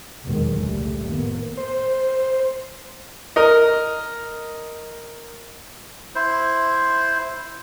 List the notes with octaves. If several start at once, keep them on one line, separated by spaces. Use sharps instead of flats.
F1 E2 B2 D#3 F#3 G#3
C#2 A#2 D3 G3 A3
F1 F2 A2 D#3 A#3 B3
C5
A#4 D#5
E4 C5